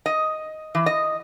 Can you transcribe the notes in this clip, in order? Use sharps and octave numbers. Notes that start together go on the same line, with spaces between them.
D#5
E3
D#5